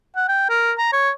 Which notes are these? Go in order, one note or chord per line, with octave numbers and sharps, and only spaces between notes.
F#5
G5
A#4
A#5
C#5